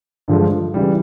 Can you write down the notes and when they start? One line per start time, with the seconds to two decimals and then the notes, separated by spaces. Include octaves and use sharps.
0.28 G2 D3 F3 G#3
0.74 C#3 E3 G3